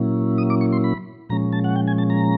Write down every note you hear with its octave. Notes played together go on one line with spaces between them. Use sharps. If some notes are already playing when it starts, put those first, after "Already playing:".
Already playing: A#2 F#3 A#3 C#4 E4
D#6
D6
C#6
C6
B5
A#2 F3 G#3 C#4 A#5
A5
F#5
G5
G#5
A5
A#5